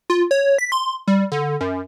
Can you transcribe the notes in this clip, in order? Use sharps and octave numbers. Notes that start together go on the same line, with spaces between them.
F4
C#5
B6
C6
G3
D3
F#2